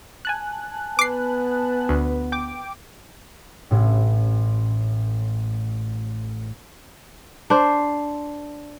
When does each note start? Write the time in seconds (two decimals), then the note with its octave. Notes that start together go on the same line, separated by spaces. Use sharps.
0.25 G#5 A5 F#6
0.99 B3 B4 D6 C7
1.89 D2
2.32 G5 D6
3.71 A1 A2
7.50 D4 C5